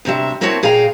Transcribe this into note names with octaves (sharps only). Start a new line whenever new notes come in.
D2 C3 F#3 E5
A#3 C4 E4 F#4 C#5 A5
A#2 G#4 F5 G5 A#5